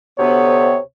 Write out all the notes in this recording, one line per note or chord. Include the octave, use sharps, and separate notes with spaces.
D2 C3 B3 C#5